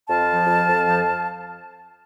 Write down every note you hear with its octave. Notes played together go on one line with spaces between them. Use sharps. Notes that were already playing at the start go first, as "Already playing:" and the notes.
F2 F5 A5
F3
F2
F2
F3